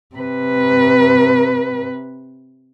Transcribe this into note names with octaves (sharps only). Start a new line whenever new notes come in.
C3 B4